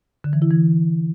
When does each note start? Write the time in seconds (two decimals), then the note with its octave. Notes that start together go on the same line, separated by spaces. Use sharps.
0.24 D3
0.33 E3
0.42 E4
0.51 E3